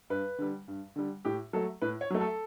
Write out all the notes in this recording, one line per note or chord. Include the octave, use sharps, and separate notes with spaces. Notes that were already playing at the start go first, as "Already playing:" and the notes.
G2 B4
D3 G3
G2
D3 G3
A2 G4
F#3 A3 A4
A2 B4
C#5
F#3 A3
A4